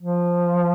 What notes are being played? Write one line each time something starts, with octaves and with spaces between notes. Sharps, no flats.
F3